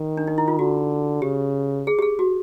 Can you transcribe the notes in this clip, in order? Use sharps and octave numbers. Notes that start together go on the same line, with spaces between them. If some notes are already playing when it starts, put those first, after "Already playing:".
Already playing: D#3
D4
D#4
E4
F4
D3 F#4
C#3 G4
G#4
G4
G#4
F#4